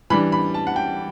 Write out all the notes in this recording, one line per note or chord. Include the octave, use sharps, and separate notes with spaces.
E3 G3 D4 B5
B5
A5
F#5
G5